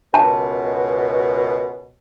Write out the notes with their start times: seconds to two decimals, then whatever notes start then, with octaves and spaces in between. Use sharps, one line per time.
0.14 C#2 F#2 B2 A5